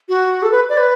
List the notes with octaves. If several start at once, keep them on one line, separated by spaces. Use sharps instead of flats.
F#4
A4
B4
D5
B4